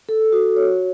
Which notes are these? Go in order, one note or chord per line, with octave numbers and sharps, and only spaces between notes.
A4
F#4
C#5